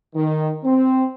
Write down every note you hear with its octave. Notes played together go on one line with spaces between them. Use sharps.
D#3
C4